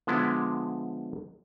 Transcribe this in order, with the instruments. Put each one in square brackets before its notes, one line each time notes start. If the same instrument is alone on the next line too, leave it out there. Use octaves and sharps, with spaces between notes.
[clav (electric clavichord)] D3 F3 G#3 B3 E4